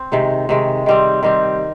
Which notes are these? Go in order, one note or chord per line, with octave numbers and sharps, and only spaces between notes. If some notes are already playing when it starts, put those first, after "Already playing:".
Already playing: C4
C3 D#3 G#3
C3 D#3 G#3
D#3 G3 C4
D#3 G3 C4